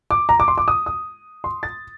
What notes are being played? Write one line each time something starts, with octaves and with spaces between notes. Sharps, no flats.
D6
A#5
D6
C6
D6
D#6
D#6
C6
A6